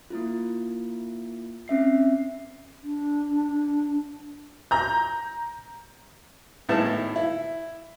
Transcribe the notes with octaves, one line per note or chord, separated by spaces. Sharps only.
A#3 E4 F4
C4 C#4 E5 C7
D4
A#5 G6
G#1 A2 B3 E4 A5
E4